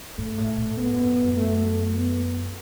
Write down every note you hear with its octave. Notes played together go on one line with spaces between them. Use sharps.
G#2 A3
A2
A2
G#2 B3
F#2
F2
F#2
A3
A3
B3